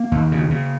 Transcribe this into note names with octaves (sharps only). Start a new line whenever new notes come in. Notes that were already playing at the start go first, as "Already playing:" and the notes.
Already playing: A#3
D#2
C#3
C#3